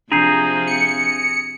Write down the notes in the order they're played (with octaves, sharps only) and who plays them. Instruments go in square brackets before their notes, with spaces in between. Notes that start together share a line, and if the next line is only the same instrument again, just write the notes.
[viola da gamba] C3 F3 C4 [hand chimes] D4 G6 C7 [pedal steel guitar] G#4 A#5
[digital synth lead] C#7